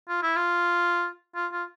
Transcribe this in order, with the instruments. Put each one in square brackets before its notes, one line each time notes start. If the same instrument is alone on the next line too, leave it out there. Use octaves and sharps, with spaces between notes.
[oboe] F4
E4
F4
F4
F4